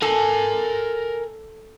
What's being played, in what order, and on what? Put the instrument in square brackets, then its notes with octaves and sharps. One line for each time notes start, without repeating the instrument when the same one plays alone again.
[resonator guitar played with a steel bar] A4 [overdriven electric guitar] A#4 G#5